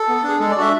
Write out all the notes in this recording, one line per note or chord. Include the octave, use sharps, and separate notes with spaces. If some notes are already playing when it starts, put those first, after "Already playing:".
Already playing: A4
B3
D4
G#4
G#3 A4
D5
D4 F#4 E5